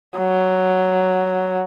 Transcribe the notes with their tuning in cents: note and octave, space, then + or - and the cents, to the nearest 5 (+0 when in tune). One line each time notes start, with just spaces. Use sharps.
F#3 +5